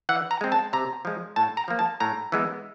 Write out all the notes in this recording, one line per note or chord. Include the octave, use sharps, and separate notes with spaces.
E3 F#5
A#5
G#3 C4
A5
C3 A#5
F3 G#3
A2 A5
A#5
F3 A#3
A5
A2 A#5
E3 G#3 B3